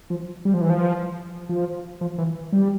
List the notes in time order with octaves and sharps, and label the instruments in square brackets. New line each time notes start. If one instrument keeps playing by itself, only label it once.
[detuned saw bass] F3
G3
F3
E3
F3
F3
F3
E3
G3